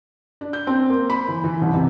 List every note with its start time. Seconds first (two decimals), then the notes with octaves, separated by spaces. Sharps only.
0.41 D4
0.53 G6
0.67 C4
0.90 A#3
1.10 B5
1.28 E3
1.44 E3
1.61 C2
1.74 C3